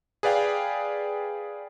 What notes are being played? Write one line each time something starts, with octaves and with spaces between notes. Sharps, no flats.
G#4 B4 D5 F5 G5